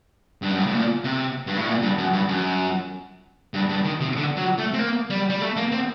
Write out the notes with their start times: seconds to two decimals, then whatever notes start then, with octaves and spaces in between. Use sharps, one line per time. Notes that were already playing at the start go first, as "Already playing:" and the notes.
0.42 G2
0.51 F#2
0.58 G2
0.66 A2
0.74 A#2
1.04 C3
1.47 G2
1.57 A2
1.67 A#2
1.82 G2
1.98 F#2
2.13 G2
2.29 F#2
3.54 G2
3.69 G2
3.85 D#3
4.01 C3
4.16 D3
4.37 F#3
4.58 A3
4.74 C4
4.79 A#3
5.10 G3
5.30 G3
5.41 A3
5.56 A#3
5.72 C4